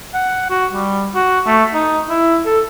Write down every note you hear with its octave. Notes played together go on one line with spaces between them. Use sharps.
F#5
F#4
G3
F#4
A3
D#4
E4
A4